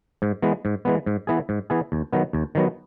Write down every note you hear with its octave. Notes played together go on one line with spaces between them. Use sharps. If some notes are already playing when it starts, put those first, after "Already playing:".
G#2
E3 G#3 B3
G#2
E3 G#3 B3
G#2
E3 B3 E4 G#4
G#2
E3 B3 E4 G#4
D#2
D#3 F#3 B3
D#2
D#3 F#3 B3